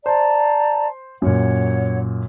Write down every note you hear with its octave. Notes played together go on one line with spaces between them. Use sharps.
C5 D5 A5 A#5
F#2 A#2 C#5 F#5